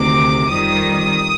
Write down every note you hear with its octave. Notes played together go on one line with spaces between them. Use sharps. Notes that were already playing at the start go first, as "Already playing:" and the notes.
Already playing: D2 C3 D#3 D6
F2 D#3 G3 D#6